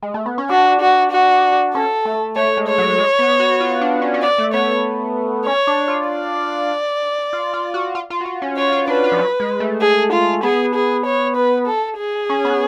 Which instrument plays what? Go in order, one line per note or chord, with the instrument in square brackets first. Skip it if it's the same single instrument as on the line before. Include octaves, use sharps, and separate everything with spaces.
[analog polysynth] G#3
A3
B3
C#4
[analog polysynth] D4 [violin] F#4
[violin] F#4
F#4
[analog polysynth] C#4 [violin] A4
[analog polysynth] A3
[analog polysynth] A3 [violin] C#5
[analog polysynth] G#3
[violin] C#5
[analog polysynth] F#3
G#3
B3
F#4
F4
D4
C#4
C#4
[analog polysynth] B3 [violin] D5
[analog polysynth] A3
[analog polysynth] B3 [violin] C#5
[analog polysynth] C#4 [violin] C#5
[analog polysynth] D4
F4
[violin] D5
[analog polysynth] F4
F4
F#4
F4
F4
F#4
F4
C#4
[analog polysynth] F4 [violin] C#5
[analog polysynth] F4
[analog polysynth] D4 [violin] B4
[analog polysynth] F4
F3
F#3
G#3
A3
[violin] G#4
F4
[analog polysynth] B3 [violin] G#4
[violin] G#4
C#5
B4
A4
G#4
[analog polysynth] C#4
B3